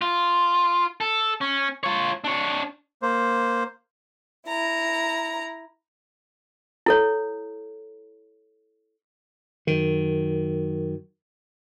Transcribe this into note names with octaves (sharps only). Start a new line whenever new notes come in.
F4
A4
C#4
F4 C#5
D4 C#5
A#3 C5
E4 A#5
E4 A4 C#5
F#2 D#3